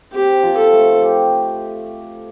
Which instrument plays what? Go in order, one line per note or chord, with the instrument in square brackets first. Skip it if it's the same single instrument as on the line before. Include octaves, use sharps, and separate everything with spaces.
[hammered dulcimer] C4 [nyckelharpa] G4
[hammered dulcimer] F3
[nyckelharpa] A4
[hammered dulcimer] A3
G4